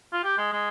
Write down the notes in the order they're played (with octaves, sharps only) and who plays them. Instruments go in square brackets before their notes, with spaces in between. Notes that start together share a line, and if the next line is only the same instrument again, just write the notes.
[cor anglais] F4
G4
G#3
G#3